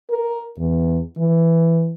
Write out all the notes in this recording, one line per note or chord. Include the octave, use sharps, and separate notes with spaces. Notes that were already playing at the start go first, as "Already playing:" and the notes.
A#4
E2
E3